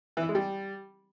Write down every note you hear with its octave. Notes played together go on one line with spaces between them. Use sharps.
E3
E4
G#3
G3